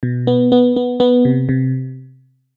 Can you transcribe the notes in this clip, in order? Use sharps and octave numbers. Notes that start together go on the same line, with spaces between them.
B2
B3
B3
B3
B3
C3
C3